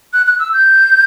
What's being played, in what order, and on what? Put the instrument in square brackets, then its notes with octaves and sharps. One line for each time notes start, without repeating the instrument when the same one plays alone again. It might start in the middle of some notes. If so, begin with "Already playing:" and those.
[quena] F#6
F#6
E6
G6